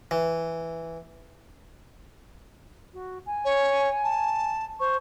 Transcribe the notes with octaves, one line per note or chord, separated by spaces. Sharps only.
E3
F#4
G#5
C#5
A5
C5 C#6